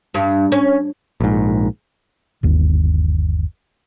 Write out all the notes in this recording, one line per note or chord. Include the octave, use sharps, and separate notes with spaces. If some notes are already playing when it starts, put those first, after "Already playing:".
G2
C#4
A#1 G#2
G1 D#2